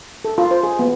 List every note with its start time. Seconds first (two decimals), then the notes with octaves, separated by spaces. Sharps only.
0.25 A4
0.38 F4
0.51 C5
0.63 G#4
0.79 B3